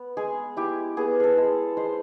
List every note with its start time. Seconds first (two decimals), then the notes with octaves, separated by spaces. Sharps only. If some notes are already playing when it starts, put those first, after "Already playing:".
Already playing: B3
0.17 G#3 G#4
0.57 E4 G4
0.97 B3 G#4
1.20 G#4 A4
1.37 G#3
1.77 G#3 C5